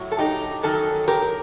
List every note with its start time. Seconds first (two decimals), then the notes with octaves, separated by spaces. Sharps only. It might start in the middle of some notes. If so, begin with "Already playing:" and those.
Already playing: A2 F#3
0.12 A4
0.18 D#4 G4
0.63 F#2 D#3 F#3 A4
1.08 G4 A#4